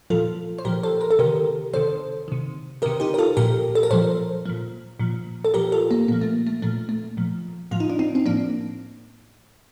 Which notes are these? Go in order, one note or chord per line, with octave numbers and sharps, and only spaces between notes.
A#2 F3 F4 A4
C5
A#2 F3 G4 A#4
A4 C5
A#4
A4
C3 D#3 G4 A#4
C3 D#3 A4 C5
C3 D#3
C3 D#3 G4 A#4
D#4 G4
A#4
F4 A4
A#2 F3 G4 A#4
A4
A#4
A#2 F3 A4 C5
A#2 F3
A#2 F3
A4
A#2 F3 G4 A#4
F4 A4
A#3
A#2 F3 A#3
A3
A3
A#2 F3 A3
A3
A#2 F3
A2 F3 F4
D#4
D4
C4 D#4
C4
A2 F3 A#3 D4